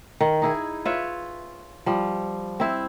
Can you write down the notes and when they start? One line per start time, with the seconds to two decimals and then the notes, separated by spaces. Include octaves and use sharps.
0.21 D#3
0.42 D#4 E4 G#4
0.85 F4 B4 C#5 E5
1.86 F3 G3
2.60 C4 E4 C5